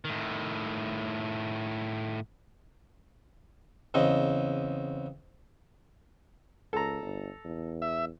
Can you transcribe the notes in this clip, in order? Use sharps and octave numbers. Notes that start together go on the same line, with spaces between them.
A2 D#3
E2 C#3 C4 D#5
C#2 A4 A#5
G1
E2
E5